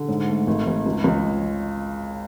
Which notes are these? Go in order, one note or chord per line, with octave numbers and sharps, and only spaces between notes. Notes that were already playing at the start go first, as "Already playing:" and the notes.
Already playing: D3
G#2
A3
G#1
G#1
C#2
C#2